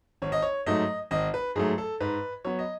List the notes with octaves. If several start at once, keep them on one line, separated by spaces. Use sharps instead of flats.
G#1 C#5
D#5
C#5
G#2 F#3 A3 D#5
G#1 D#5
B4
G#2 F#3 A3 G#4
A4
G#2 B4
F#3 B3 C#5
D#5